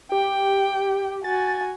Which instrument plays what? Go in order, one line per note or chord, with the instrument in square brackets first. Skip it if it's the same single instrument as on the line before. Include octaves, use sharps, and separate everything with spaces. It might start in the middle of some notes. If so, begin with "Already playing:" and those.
[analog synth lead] G4 [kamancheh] G5
[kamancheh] F#4 G#5 [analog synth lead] A6